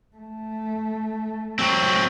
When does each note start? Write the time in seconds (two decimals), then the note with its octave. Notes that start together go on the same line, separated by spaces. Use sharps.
0.17 A3
1.59 F#3 C4